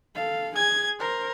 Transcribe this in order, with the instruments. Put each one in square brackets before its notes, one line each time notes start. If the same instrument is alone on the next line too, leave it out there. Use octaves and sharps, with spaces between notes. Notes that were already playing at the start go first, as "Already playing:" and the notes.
[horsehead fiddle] A4 F5
[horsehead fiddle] G#4 G#5 [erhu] G#6
[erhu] A#4 [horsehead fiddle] C5